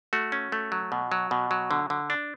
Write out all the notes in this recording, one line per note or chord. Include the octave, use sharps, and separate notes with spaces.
A3 F#4
C#4
A3
F#3
B2
F#3
B2
F#3
D3
D3
D4